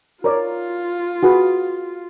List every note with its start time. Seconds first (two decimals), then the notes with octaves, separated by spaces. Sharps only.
0.24 F4 A#4 C#5 D5
1.23 F#4 G#4 B4